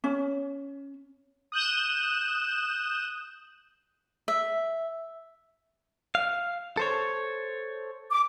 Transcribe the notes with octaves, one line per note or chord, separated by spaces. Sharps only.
C#4
D#6 F#6 G6 E7
E5
F5
A4 C5 C#5
D6